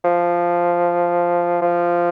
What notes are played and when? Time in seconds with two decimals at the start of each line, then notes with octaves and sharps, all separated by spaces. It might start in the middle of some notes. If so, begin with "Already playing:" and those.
0.04 F3
1.62 F3